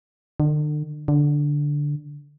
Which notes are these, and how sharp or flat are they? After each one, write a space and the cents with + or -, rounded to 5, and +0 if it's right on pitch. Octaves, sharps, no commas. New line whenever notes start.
D3 +40
D3 -5